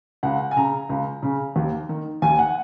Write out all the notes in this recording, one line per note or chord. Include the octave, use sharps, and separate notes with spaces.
C#2 F#5
G#5
C#3 A#5
C#2
C#3
D#2
D#3
D#2 G#5
F#5